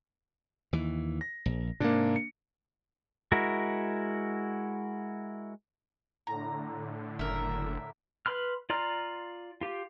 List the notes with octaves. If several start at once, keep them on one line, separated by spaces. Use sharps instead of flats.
D#2 E3
A#6
A#1
G#2 C3 A#3 D4
C#7
G#3 E4 F#4 A#4
A2 D3 A#5
F#1 A#4 E5
B4 B5 C6 F6
F4 D5 A#5 C6 F6
F4 G4